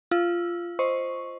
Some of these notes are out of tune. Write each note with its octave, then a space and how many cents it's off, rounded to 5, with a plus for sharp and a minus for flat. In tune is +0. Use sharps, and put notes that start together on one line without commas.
F4 -10 E6 +0
C5 +0 D#5 +0 C#6 +0